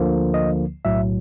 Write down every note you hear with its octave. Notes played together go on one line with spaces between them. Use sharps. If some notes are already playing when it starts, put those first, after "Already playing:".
Already playing: D2 D3 F3 A#3
D#5
B1 A2 F#3 E5